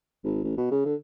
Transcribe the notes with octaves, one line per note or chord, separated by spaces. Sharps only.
G#1
A1
B2
C#3
D3